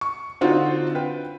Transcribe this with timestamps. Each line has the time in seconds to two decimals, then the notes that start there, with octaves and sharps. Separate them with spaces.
0.01 C#6
0.41 D3 C4 D#4 F4 F#4
0.95 B4 G5